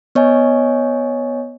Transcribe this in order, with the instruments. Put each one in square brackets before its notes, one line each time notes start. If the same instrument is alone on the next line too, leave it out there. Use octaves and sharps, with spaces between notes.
[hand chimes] B3 C#5 D#5 G#5